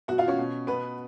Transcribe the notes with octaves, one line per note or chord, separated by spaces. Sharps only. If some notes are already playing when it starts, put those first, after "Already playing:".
B2 F#4 F#5
F4 F5
C#4 C#5
B2
B2 B3 B4